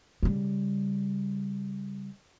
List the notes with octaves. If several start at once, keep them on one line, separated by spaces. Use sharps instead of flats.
C#3 G3